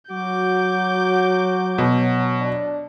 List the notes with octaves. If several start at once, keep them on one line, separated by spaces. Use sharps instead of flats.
F#3 F#4 D6 G6
B2
D4